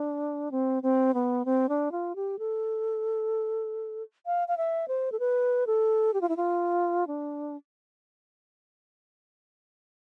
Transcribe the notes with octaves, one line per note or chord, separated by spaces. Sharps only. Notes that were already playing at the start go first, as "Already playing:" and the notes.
Already playing: D4
C4
C4
B3
C4
D4
F4
G4
A4
F5
F5
E5
C5
A4
B4
A4
G4
F4
E4
F4
D4